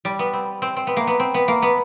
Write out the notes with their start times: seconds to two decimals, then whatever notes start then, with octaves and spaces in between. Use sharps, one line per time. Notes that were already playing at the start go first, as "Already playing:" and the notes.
0.05 G3
0.19 B3
0.33 C4
0.62 C4
0.77 C4
0.87 B3
0.97 A#3
1.07 B3
1.20 C4
1.34 B3
1.48 A#3
1.62 B3